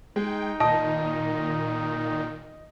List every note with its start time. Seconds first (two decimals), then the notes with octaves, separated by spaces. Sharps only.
0.16 G#3 D#4 G5
0.60 A#2 D#3 D#5 A5 D#6